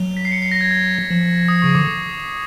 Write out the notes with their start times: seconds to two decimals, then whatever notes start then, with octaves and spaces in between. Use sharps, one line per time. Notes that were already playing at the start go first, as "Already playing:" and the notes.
Already playing: F#3
0.17 B6
0.25 C7
0.32 C#7
0.42 C7
0.51 A#6
0.61 G#6
0.71 G#6
1.11 F3
1.48 D#6
1.62 C#3 C#6
1.71 D#6
1.75 D3 D6